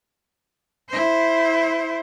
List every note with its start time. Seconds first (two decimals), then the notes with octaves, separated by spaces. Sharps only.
0.89 E4 C5